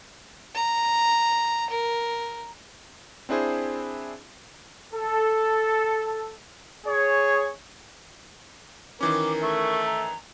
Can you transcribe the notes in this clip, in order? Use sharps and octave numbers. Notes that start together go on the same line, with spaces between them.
A#5
A#4
C4 D4 E4 G#4 C5
A4
G#4 C#5
D#3 E3 C#4 A#4 D6
A3 C#6
A#5